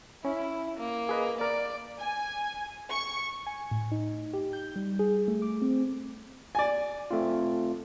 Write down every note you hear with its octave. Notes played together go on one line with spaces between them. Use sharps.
C#4 E4
A#3
G#4 B4 D#5
A#4 D5
G#5
C#6
G#5
A2
D#4
G4
G6
G3
G#4
A3
D6
C4
D5 G#5
A3 C4 F4